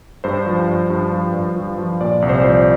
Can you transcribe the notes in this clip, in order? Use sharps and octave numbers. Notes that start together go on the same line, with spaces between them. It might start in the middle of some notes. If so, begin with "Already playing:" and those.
G2 C5
F3
G2
G2
F3
G2
F3
F3
A#2 D5
C2
C5
D5
F3 C5
D5